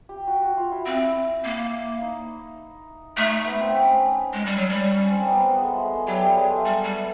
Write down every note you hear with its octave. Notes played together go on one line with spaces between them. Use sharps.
G4
F#4
F#4
F4
E4
C4 E4
A#3
D#4
A3 D#4
B3
C4
C#4
G#3
G3
F#3
G3
C#4
C4
A#3
B3
B3
G#3
A3
G#3
A3
F#3 G3
G3
G#3
A3
G3
G3